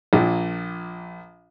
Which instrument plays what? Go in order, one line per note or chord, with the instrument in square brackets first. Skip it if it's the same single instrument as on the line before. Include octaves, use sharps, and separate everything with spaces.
[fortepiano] A#1 A#2